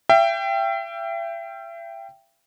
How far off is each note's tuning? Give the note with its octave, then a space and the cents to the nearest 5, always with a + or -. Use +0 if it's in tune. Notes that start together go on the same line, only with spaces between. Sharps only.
E5 +35 G5 +0